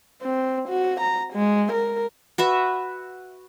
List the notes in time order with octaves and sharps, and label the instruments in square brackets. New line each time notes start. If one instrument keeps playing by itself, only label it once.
[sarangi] C4
F#4
A#5
G#3
A#4
[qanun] F#4 B4 E5